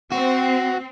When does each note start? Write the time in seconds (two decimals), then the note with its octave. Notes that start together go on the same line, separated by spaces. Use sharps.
0.12 C4 F#4